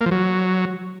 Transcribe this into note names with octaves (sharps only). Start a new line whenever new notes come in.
A#3
F3
F#3